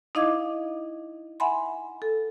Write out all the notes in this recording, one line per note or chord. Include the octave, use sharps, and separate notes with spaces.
D#4 E4 D#5 F5 D6 G#6
E5 F#5 G#5 B5 C6
A4